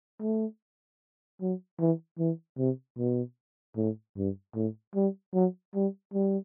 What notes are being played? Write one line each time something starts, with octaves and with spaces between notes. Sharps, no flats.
A3
F#3
E3
E3
C3
B2
A2
G2
A2
G3
F#3
G3
G3